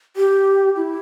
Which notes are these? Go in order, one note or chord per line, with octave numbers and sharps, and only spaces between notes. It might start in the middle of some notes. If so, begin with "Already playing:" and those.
G4
E4